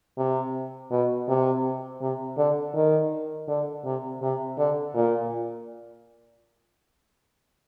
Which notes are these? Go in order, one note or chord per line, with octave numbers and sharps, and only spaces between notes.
C3
B2
C3
C3
D3
D#3
D3
C3
C3
D3
A#2